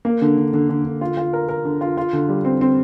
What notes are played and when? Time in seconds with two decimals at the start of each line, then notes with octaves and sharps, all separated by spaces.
0.05 A#3
0.22 D3
0.37 D3
0.53 D3
0.69 D3
0.85 D3
1.01 F4
1.17 F4
1.33 A#4
1.49 A#4
1.65 D3
1.81 F4
1.97 F4
2.13 D3
2.29 G3
2.45 C4
2.61 C4